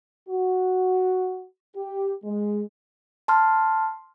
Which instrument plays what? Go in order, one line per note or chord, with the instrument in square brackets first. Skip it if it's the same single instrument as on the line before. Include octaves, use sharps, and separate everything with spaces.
[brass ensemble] F#4
G4
G#3
[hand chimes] A5 C6 F6